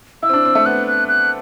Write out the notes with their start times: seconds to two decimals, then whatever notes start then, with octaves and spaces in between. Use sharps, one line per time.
0.23 E4 E6
0.29 C4
0.33 D4
0.45 C4
0.55 A3
0.66 B3 F#6
0.87 F#6
1.08 F#6